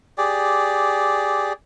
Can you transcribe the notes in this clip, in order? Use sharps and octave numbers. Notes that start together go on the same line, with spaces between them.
G4 G#4 D5